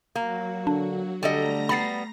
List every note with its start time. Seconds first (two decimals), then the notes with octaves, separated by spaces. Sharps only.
0.15 F#3 A#3 F#4
0.67 D3 D4
1.23 D3 G3 A3 A4 D#5 A#5 A#6
1.69 G3 B3 B5 A6 C7